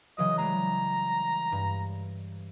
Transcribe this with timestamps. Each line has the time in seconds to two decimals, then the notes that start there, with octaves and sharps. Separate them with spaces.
0.18 C#3 E3 F#3 D#5
0.38 G3 G#3 A#5
1.52 G2